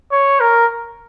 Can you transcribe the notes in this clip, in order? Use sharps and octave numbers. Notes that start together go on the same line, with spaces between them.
C#5
A#4